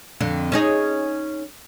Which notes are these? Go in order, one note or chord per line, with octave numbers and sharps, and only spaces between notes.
F2 D3
C#4 D#4 G#4